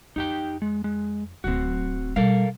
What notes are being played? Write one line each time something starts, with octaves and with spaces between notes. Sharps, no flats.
F2 D#4 G4 G5
G#3
G#3
D1 F#3 C4 F#4
B2 G3 A4 A#4 F5